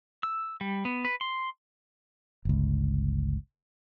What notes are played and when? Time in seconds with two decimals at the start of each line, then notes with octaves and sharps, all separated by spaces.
0.23 E6
0.61 G3
0.85 B3
1.05 B4
1.21 C6
2.45 G1 C#2